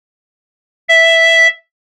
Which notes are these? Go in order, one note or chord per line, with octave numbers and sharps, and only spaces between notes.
E5